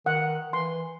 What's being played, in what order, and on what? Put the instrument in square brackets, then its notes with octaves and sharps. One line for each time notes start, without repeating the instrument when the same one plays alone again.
[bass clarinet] D#3 [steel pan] F#5
[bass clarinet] E3 [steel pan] C6